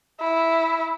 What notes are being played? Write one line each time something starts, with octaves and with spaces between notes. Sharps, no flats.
E4